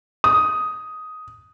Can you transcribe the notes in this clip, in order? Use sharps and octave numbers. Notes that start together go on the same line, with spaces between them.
D#6